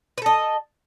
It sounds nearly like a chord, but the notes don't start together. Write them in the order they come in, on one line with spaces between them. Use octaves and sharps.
B4 A4 D#5